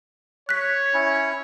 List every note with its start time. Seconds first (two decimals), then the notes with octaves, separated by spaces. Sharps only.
0.49 C#5 F#6 B6
0.94 C#4 E4